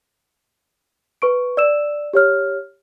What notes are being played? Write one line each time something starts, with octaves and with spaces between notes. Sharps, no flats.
B4 C#6 D7
D5 E6 E7
G4 C#5 F6